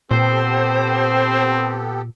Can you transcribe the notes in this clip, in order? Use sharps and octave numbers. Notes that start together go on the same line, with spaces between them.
A#2 B3 C4 G4 A4 C5